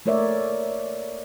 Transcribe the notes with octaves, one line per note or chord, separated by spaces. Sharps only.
A3 A#3 A#4 C#5 D5 E5